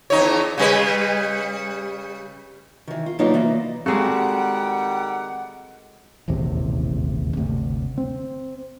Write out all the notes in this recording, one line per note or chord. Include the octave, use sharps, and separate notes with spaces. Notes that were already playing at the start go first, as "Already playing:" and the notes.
E2 D#4 C#5
C#3 G3 B4
D#3 E3
F4
F#3 A#3 D#4 F4 B4 D5
E3 A#3 D5
D#3 G3 G#3 C4 F#4 A4 F#5
D#1 A1 E2 C3
G1 D2 C3
C4